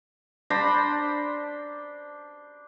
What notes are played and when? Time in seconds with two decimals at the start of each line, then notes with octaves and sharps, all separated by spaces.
0.50 D4 C5 A#5 B5